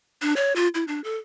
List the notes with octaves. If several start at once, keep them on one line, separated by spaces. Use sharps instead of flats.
D4
C#5
F4
E4
D4
A4